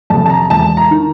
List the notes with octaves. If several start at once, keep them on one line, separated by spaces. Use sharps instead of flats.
F2 C3 A5
A5
A#5
E1 A5
A#5
D#3